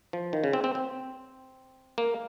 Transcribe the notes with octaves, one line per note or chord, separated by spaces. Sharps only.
F3
D#3
C#3
C4
C4
C4
A#3